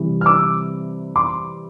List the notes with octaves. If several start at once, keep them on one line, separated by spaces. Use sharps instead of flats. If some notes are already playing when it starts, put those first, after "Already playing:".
Already playing: C3 E3 G3
F6
D6 E6
C6 D6